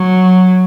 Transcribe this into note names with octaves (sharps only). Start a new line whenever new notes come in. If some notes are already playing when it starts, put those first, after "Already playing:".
Already playing: F#3